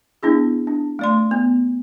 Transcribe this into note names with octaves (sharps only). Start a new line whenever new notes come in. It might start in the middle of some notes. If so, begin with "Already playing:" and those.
B3 D4 E4 G#4
D4
A3 D5 C6
B3